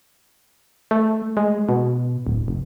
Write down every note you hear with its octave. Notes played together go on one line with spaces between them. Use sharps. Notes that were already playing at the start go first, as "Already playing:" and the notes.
A3
G#3
B2
D1
F1